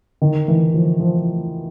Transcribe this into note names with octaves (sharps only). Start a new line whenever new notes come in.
D#3
E3
F3
F3